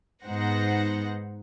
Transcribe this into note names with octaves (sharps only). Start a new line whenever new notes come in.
G#2 B3 D#4 C5 F#5 A#6